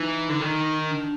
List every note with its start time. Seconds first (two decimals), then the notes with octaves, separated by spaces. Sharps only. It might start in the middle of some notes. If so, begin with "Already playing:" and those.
Already playing: E3 D#4
0.29 D3
0.41 D#3
0.88 D4